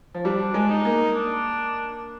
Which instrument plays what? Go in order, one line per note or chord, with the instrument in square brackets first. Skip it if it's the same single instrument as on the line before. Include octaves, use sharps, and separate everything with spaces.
[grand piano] F3
[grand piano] G3 [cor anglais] D4
[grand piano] G#3
[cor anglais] D#4
[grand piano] A#3
[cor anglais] D4